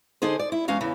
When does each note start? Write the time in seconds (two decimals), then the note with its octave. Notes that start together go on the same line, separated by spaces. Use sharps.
0.22 D3 D#4 G#4 C5
0.39 D5
0.52 E4
0.68 E2 G#3 C#4 F5
0.81 E2 C#3 E3